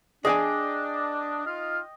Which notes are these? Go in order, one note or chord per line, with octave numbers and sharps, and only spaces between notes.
D4 G#4 D5 D#5 G5 G#5
D#4 F4 F6